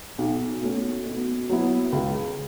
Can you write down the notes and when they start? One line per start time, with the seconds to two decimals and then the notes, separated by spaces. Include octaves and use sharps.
0.18 B1
0.62 B2 A3 C#4
1.06 B2
1.49 F#3 B3 E4
1.93 C#2